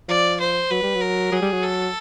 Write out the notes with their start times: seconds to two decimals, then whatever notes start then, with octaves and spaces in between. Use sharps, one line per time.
0.09 F3 D5
0.40 C5
0.70 F#3 B4
0.83 G3
0.95 F#3
1.01 A#4
1.32 F#3 G#4
1.42 G3
1.52 F#3
1.63 A4